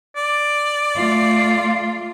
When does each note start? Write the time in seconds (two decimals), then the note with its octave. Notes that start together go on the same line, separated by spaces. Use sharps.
0.17 D5
0.95 A3 F4